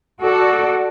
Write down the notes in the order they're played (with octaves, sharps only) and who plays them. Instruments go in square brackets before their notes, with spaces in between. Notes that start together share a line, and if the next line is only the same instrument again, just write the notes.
[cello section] F#4 A4 D5